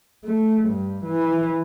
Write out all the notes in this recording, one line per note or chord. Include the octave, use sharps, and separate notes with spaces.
A3
G2
E3